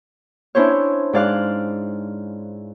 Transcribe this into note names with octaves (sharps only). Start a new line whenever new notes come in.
C#4 D4 E4 C5 C#5
G#2 D5 F5 F#6